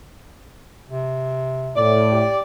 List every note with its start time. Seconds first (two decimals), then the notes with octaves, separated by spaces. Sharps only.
0.88 C3
1.76 A2 D5
2.12 G4